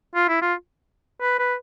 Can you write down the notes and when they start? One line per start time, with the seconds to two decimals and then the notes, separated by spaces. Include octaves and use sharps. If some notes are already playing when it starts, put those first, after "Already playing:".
0.15 F4
0.29 E4
0.42 F4
1.21 B4
1.39 B4